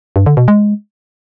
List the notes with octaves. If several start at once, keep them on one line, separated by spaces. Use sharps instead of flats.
G2
D3
B2
G#3